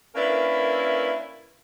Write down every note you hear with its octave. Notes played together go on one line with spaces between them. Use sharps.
A#3 C#4 D4 E4 A#4 B4